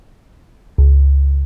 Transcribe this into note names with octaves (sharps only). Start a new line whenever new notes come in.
C#2